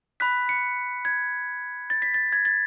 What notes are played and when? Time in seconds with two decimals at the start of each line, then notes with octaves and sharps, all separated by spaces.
0.20 B5 F#6 B6
0.49 C#7
1.05 G#6
1.90 A6
2.02 B6
2.14 A6
2.33 G#6
2.45 A6